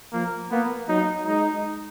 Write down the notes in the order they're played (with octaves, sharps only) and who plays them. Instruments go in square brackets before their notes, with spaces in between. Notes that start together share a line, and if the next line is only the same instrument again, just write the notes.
[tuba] F3 [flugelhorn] A#3
[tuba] A#3 [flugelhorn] B3
[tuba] F#3 [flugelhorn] D#4
[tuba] G#3 [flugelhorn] D#4